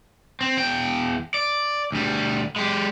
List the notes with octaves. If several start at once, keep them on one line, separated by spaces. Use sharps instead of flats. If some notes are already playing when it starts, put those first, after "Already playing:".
C4
E2 G5
D5
D2 G3
G#3 G4